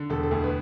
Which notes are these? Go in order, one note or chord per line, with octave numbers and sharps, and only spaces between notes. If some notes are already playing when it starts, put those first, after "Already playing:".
Already playing: D3
E1 A4
A4
D2
B4